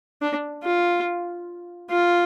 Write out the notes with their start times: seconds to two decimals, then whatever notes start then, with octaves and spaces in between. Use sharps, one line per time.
0.22 D4
0.63 F4
1.90 F4